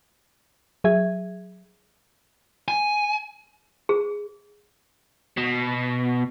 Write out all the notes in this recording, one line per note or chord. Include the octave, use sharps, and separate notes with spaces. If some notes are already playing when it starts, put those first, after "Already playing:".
F#3 G#4 E5 G#6
G#5
G#4
B2